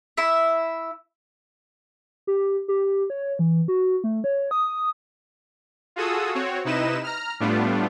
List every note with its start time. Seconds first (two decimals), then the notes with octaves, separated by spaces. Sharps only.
0.17 E4 E5
2.27 G4
2.68 G4
3.10 C#5
3.39 E3
3.68 F#4
4.04 A3
4.24 C#5
4.51 D#6
5.96 F4 F#4 G#4 A4 D#6 E6
6.35 C4 F#4 C#5
6.65 C3 D#4 E4 B4 D#5 E7
7.04 A#5 F6
7.40 A2 G3 A3 B3 D4 F4